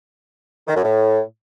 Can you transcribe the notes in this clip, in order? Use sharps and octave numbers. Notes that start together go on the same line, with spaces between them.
D#3
F#2
A2